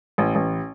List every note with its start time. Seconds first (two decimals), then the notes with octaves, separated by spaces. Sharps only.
0.18 A1
0.35 A1